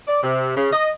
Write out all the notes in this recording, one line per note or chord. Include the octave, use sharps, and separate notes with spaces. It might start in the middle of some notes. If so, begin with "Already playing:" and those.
D5
C3
C#3
D#5